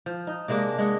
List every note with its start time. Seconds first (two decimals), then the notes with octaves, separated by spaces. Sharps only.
0.06 F3
0.27 D#4
0.48 C3 G#3 A#3 D4
0.78 G#3 G#4 F#5